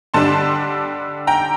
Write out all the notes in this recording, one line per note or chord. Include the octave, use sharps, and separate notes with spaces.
D3 G3 D4 A5 C6
G5 A#5